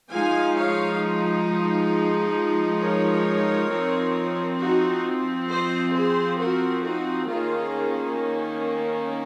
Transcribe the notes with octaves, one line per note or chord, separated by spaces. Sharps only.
F3 G#3 D#4 F5 G#5
C#5 F5
A#4 C#5
F3 C4 D#4
D#4 F#4
C5 D#5
G#4 C5
F#4 A#4
D#4 F#4
D#3 A#3 C#4 F4 G#4